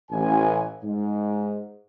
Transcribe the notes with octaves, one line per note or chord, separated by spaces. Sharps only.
A1 G#5
G#2